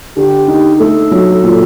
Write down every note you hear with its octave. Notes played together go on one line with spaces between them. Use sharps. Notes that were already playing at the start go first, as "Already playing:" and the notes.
D3 G4
D#4
A3 A4
F#3
A#2